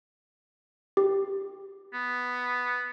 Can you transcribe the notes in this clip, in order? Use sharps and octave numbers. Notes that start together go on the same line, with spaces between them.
G4
B3